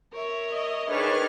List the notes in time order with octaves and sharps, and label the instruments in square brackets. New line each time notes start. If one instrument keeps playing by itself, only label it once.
[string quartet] A#4 C#5 E5
[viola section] D#5
[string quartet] D#3 D4 F6 [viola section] G#4 B4 C#5